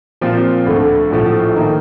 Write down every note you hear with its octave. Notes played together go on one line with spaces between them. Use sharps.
A#2 F3 C4 F4
D2 D3 A3
A#1 A2 F3 A3
D#3 A#3 D#4